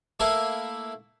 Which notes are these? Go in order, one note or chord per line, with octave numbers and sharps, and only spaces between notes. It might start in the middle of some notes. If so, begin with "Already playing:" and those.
A3 A#3 E4